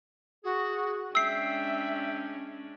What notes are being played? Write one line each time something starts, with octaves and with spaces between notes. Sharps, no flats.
F#4 G#4
G#3 C#4 D4 E5 G5 E6 C7